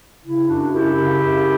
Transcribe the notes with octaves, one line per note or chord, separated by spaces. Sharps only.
C#3 E4
F#2 D4 F#4
F#2 E4 G4
C#3
F#2